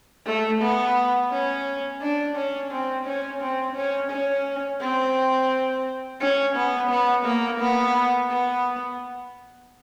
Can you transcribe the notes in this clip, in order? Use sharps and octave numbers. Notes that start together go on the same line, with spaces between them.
A3
B3
C#4
D4
C#4
C4
C#4
C4
C#4
C#4
C4
C#4
B3
B3
A#3
B3
B3